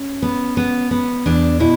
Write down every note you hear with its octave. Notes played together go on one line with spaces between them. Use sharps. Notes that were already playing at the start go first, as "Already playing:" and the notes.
Already playing: C#4
B3
B3
B3
E2 D4
B2 E4